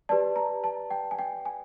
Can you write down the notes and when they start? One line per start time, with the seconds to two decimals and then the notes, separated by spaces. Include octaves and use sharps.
0.09 G4 B4 D5 A5
0.36 A#5
0.64 A5
0.90 G5
1.11 G#5
1.19 G5
1.45 G#5